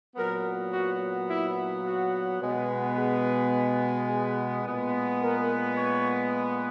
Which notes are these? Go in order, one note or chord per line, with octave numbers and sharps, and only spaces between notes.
A#2 F#3 B3 A#4
F#4
E4
F#4
B2 G#3 B3
G#4
G#4
A#2 G#3 B3
A#4
C#5